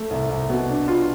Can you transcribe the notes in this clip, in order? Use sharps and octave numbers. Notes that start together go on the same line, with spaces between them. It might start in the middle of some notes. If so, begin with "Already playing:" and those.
Already playing: A3
C2
C2
B2
D4
F4